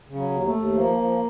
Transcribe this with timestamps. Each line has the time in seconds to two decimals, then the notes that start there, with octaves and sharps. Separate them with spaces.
0.08 C#3
0.15 F#3
0.30 D#2
0.45 A3
0.53 D#2
0.74 F3 A#3
0.97 F3